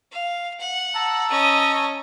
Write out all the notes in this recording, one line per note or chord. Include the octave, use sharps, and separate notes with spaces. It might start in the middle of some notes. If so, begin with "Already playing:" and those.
F5
F#5
A5 A#5 E6
C#4 D#5